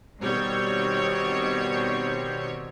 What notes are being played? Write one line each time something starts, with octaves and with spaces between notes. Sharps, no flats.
B2 D#3 G3 C4 C#5